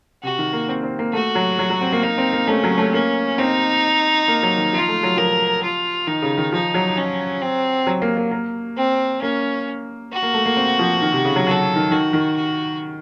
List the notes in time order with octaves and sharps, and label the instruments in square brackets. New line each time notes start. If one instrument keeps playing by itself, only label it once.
[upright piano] C3 [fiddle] F#4
[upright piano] D#3
A#3
C4
C4
A#3
[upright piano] A3 [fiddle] F#4
[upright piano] F#3
F#3
F#3
C4
A#3
[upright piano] A#3 [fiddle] D#4
[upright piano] C4
A#3
[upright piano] A3 [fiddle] C#4
[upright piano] F#3
A3
[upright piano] A#3 [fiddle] C#4
[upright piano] C4 [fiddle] D#4
[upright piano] A#3
F#3
D#3
[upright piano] F3 [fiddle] F4
[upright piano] A3
F#3
[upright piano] F3 [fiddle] A#4
[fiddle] F4
[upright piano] D#3 [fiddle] D#4
[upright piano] C#3
D#3
[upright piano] F3 [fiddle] D#4
[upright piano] F#3
[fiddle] C#4
C4
[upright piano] F#3
A#3
A#3
A#3
[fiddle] C4
[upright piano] A#3 [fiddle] C#4
[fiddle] F#4
[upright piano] A#3
A3
A#3
C4
F3
D#3
C3
C#3
F#3
[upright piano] F#3 [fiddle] A4
[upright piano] D#3
[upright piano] D#3 [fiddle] F#4
[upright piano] D#3
[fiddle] F#4